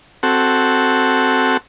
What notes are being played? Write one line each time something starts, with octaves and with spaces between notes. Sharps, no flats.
C4 F#4 A4